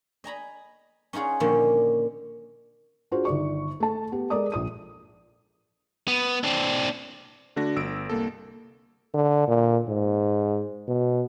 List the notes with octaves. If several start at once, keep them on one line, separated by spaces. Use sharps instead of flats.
D#5 G#5 A#5 B5
C#4 D#4 F4 G#4 F#5
A#2 D3 D#3 F3 A#3 C#4
D4 F4 F#4 G#4 C5
G1 D#3 D5 C#6
A3 A5
B3 G4
G#3 A4 A#4 D5 A#5 D#6
A#1 D#6 D#7
B3
C4 D4
D3 A3 D4 F#4 A#6
G1 E6 D7
C2 A#3 A4
D3
A#2
G#2
B2